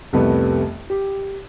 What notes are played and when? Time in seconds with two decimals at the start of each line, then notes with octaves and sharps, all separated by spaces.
0.13 C2 F2 G3 A3 B3
0.90 G4